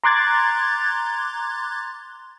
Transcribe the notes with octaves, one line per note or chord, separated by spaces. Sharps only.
A#5 C6 D6 F#6 G#6 A6